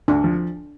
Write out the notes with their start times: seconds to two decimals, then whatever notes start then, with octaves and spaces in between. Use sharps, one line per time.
0.08 D2 D4
0.24 F3